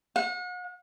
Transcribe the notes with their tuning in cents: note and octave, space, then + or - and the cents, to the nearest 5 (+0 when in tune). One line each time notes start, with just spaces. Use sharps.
F#5 -40